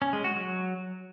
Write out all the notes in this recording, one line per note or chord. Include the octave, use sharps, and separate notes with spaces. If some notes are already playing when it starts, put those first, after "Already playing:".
C#4
G#3
F#4
F#3